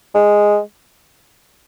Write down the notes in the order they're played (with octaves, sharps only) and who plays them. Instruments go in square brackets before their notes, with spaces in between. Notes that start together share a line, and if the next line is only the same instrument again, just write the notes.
[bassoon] G#3